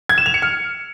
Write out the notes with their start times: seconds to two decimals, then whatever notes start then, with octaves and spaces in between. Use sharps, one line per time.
0.09 G#6
0.18 E7
0.26 F7
0.34 C#7
0.42 F6